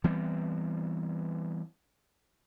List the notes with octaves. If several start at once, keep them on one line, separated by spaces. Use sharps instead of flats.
E3 G3 B3 C4